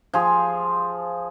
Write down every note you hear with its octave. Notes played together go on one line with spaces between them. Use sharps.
F3 G#4